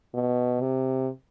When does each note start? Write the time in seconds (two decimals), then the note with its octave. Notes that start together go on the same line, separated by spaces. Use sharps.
0.15 B2
0.61 C3